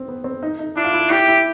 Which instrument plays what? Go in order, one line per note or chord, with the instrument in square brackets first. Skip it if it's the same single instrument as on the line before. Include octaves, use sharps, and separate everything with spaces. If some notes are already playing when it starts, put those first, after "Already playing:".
Already playing: [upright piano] C4
B3
C4
D#4
D#4
[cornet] D4 [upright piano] E4
[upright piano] F4
E4
[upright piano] E4 [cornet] G4
[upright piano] E4